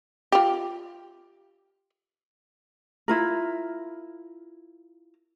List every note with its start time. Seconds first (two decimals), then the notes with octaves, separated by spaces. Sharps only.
0.32 F4 G4
3.08 E4 F4 A#4